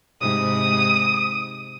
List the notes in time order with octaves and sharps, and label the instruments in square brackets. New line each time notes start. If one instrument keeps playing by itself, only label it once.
[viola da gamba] G#2 C3 [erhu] D#6